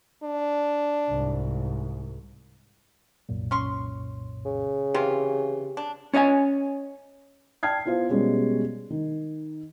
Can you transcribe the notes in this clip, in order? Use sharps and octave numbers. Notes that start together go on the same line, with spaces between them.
D4
C2 G#2
C2 F#2 A#2
C#4 C6 C#6
C#3
C3 E3 F4 G4
D4
C#4 C#5 D#5 E5 G#5
D5 G5 A5 F6 G#6 C7
B3 E4 F4 C5 F5
B2 G3 G#3 C#4
D#3